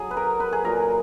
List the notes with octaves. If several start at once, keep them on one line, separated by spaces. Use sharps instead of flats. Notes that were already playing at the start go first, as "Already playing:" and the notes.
Already playing: F#3 G#4
B4
A#4
B4
G#4
A#2 F#3 A#4